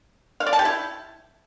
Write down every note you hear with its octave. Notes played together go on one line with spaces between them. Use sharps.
F5
D5
A5
G4
E4